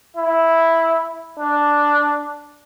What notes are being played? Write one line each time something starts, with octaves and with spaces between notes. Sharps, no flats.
E4
D4